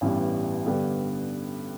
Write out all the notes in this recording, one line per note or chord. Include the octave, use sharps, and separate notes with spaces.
A1 G2 E3 G3 B3
G2 D3 B3 G4